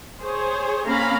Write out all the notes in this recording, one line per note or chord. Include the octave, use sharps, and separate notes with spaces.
G#4 C5 C#5
A#3 C4 C#4 F5 A#5 B5